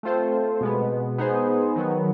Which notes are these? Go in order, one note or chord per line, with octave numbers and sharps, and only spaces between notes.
A3 C4 F4 A4 C5
B2 G#3 B3
B3 D#4 G#4 C5
D#3 F#3 B3